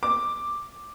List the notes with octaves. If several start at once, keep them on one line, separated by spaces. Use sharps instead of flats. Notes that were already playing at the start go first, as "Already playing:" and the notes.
D6